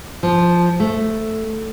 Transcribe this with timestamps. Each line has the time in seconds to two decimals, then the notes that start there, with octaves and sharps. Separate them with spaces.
0.23 F3
0.80 A3